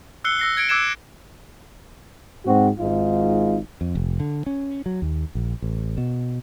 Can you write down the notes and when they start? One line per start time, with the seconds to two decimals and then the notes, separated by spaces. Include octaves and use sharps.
0.24 E6 F#6 C7 C#7 G7
0.39 E6 A#6 C7
0.57 G#6 C#7 D7 G7
0.69 D6 E6 F#6 G#6 C7 E7
2.45 G#2 C4 F#4
2.79 G#1 G#2 D#4 F4
3.81 F2
3.95 F1
4.20 D3
4.46 C#4
4.86 F#3
5.02 D#2
5.35 A#1
5.62 A1
5.98 B2